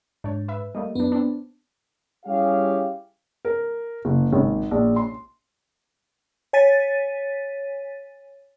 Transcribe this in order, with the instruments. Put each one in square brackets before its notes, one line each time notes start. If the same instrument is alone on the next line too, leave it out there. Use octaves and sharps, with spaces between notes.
[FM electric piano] G#2 [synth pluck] D4 C#5
[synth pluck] B4 E5
[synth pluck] G3 A3 A#3 [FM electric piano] D#5
[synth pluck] F#2 D4 [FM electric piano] B3
[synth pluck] C4 D4
[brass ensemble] G3 C#4 E4 G4 G#4 F5
[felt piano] A#4
F#1
G#1
A#1
C6
[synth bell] C#5 G#5 A6 B6 D#7